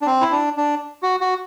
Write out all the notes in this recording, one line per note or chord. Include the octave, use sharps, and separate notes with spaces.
D4
C4
E4
D4
D4
F#4
F#4